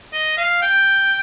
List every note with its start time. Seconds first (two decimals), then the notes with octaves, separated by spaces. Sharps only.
0.13 D#5
0.37 F5
0.62 G5